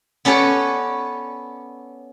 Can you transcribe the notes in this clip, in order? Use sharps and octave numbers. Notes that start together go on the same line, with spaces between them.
B3 C#4 A4 B4 C#5 D5